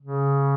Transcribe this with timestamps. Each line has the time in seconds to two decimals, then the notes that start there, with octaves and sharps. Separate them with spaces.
0.01 C#3